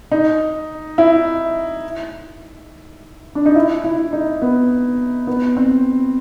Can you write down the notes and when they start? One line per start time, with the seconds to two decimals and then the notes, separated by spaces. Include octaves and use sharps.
0.12 D#4
0.98 E4
3.35 D4
3.46 D#4
3.55 E4
3.84 E4
4.13 D#4
4.42 B3
5.27 B3
5.57 C4